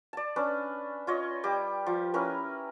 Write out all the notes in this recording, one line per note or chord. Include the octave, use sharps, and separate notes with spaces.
D5 A5
C#4 D4 B4
F4 C#5 D#5
G3 G4 D6
F3
C#4 E4 A#4 B4